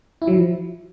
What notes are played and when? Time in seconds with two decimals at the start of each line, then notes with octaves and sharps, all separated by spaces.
0.22 E4
0.27 F#3
0.33 F3